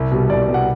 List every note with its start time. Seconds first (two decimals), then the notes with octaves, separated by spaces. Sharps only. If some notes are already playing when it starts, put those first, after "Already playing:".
Already playing: C2
0.12 B2 G3
0.30 C2 D5
0.42 D5
0.48 B2 G3
0.54 F#5